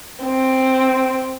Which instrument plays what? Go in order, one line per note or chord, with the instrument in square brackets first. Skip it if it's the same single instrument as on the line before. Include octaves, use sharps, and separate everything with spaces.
[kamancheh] C4